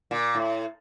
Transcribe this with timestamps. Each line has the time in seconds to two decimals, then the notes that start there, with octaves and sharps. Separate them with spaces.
0.11 A#2
0.35 A2